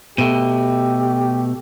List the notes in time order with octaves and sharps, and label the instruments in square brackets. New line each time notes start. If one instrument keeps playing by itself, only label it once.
[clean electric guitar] B2 A3 [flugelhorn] G4